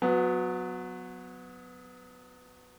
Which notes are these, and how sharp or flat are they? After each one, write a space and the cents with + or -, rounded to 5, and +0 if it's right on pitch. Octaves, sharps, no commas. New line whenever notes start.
F#3 -20 B3 +15